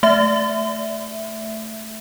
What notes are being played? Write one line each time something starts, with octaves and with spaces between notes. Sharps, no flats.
A3 E5